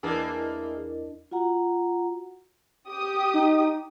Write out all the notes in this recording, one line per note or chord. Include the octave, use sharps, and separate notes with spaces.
E2 E3 A#3 D4 E4 G#4 A#4 D#5
F4 F#4 F#5 A#5
G4 D#6
D#4